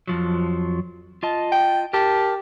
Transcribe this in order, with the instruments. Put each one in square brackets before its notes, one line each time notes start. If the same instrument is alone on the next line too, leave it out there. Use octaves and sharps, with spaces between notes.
[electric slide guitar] F2 F3 F#3
F4 D#5 A5
[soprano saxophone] G5
[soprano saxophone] G4 [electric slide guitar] A#4 A5